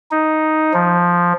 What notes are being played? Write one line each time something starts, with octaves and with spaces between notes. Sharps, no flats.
D#4
F3